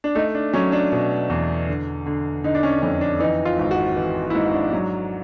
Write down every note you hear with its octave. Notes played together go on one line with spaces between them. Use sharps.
D4
A3 D#4
D4
F#3 C#4
D4
B2
E2
D3
D3
D3 D#4
D4
C#4
F2 C#4
D4
E3 D#4
F4
G#1
F#4
E3
E4
G#2 D#4
D4
F#3